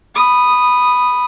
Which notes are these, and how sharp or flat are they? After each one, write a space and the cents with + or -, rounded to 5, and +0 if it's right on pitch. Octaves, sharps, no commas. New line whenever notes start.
B5 +0 D#6 -10